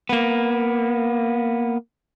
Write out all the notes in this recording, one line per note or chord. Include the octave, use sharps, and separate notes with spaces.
A#3 B3